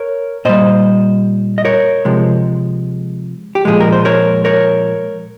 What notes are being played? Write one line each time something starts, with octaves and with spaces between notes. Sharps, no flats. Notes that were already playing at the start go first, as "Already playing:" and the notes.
Already playing: A#4 C#5
A#2 G3 C5 D#5
D#5
A#4 C#5
C3 F3 G#3
G4
A#2 F3 G#3 G#4
A#4
C5
A#4 C#5
A#4 C#5